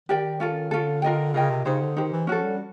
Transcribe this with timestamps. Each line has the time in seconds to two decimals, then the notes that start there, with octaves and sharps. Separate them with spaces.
0.09 D#3 G4 A#4 D5 G5
0.40 C#4 F4 A4
0.71 D3 C#4 F4 A4
1.02 F4 A#4 D#5 G5
1.34 C#3 F4 A#4 D#5 G5
1.50 C3
1.65 C#3 D#4 G4 C5
1.81 D3
1.97 D#3 D#4 G4 C5
2.12 E3
2.27 F3 C#4 F#4 A4
2.44 G3